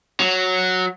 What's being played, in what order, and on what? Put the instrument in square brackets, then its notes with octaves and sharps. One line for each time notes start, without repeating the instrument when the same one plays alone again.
[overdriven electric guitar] F#3